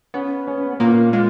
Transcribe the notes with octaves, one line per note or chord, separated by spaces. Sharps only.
B3 C#4
C#4
A#2 A#3
G#3 F4